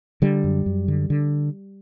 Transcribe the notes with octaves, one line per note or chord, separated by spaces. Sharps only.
D3 G3
F#2
F#2
D3
D3